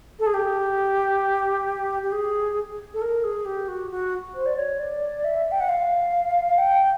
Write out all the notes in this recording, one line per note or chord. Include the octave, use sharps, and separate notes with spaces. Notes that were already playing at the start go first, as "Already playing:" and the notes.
A4
G#4
G4
G4
G#4
A4
A#4
G#4
G4
F#4
F#4
C5
D5
C#5
D5
E5
G5
F#5
F5
G5